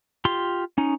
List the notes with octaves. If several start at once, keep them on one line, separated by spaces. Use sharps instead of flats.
F4 G4 C6
C#4 D#4